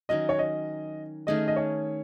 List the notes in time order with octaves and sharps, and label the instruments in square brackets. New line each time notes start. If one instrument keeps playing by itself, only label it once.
[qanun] D#3 F#3 C#4 [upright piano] D#5
[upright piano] C#5
D#5
[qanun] D#3 A3 C#4 G#4 [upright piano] D#5
[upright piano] D#5
C#5